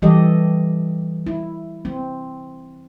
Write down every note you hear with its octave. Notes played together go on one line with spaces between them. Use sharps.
E3 G3 G4 A4 D#5
E4
C4